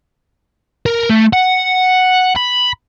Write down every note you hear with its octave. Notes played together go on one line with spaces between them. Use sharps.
A#4
A3
F#5
B5